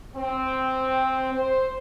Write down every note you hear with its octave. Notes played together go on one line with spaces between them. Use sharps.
C4
C5